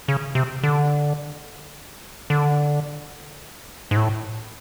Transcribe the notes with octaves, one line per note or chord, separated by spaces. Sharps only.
C#3
C3
D3
D3
G#2
A2